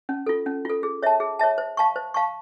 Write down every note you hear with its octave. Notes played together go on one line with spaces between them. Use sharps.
C#4
F4 A4
C#4
F4 A4
G#4
C#5 E5 A5
G#4
C#5 E5 A5
C5
F5 A5 C#6
C5
F5 A5 C#6